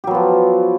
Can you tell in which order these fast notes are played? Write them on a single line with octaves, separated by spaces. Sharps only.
G4 F#3 B3 F3